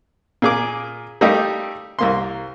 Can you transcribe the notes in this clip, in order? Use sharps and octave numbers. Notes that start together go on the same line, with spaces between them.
A#2 G#4 D6
G3 A3 A#3 D#4 G4
C2 A#3 C6